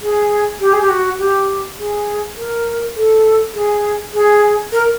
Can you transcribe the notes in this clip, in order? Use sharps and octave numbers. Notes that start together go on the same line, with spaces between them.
G#4
G4
G#4
G4
F#4
G4
G#4
A#4
A4
G#4
G#4
A#4